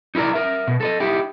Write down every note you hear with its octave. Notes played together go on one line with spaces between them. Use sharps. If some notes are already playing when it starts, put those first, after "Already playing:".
D#4 E4 A#4 D5 A#5
A#4 E5
B2
A4 B4 D#5
D#4 E4 G4